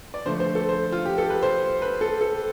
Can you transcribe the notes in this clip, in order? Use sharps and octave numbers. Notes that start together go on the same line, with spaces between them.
D5
D3 F3 A3 C5
C5
A4
C5
F4
G4
A4
B4
C5
B4
A4
A4